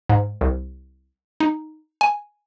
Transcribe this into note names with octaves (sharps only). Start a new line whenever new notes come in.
G#2
C2
D#4
G#5